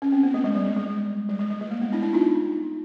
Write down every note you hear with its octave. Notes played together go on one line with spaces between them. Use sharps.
C#4
C4
B3
A3
G#3
G3
G#3
G#3
G3
G#3
G#3
A3
A#3
B3
D4 E4
D4 E4
D#4 F4